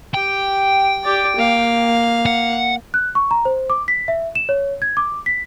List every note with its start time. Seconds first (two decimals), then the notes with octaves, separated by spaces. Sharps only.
0.14 G4 G5
1.04 G4 D5
1.36 A#3 F5
2.26 F#5
2.94 F#6
3.15 C#6
3.31 A#5
3.45 C5
3.70 D6
3.88 B6
4.08 E5
4.35 E7
4.49 C#5
4.82 G#6
4.97 D6
5.26 B6